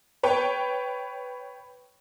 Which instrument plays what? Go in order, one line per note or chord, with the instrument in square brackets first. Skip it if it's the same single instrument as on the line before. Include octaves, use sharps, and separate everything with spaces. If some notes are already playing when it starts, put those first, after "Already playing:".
[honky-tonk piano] B4 C#5 G5